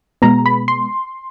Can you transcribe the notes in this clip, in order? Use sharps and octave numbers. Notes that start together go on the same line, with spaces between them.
B2 G#3 B3 A#5
B5
C6